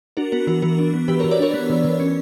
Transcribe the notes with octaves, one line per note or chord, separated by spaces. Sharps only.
D4 F#4 A#4
B3 F#4 A#4
E3 F#4 A#4
E3 F#4 A#4
D4
B3
E3 G4 B4
E3 A#4 C#5
B4 D5
D4 A#4 C#5
B3
E3
E3
C#4